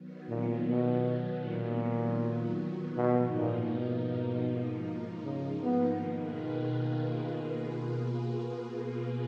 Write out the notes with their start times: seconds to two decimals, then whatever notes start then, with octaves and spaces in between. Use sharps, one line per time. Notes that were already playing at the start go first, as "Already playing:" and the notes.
Already playing: D#3 F#3 B3
0.29 A#2
0.68 B2
1.44 A#2
2.97 G#2 B2 F3 A#3 D#4
3.34 A#2
3.73 B2
5.24 C#3
5.63 B3
6.01 B2 D#3 A#3 F4 G#4 B4